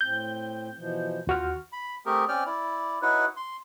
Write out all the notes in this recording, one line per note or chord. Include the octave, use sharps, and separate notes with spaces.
A2 C4 G6
B2 E3 F3
D#2 F4 F#4 F6
B5
A3 C4 G4 G#4 A#4
C4 C#4 D5 G5 F6
E4 D5
D#4 E4 F#4 B4 C#5
C6